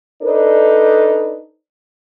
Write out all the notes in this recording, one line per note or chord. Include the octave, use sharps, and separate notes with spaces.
D4 D#4 A4 B4 C5 D5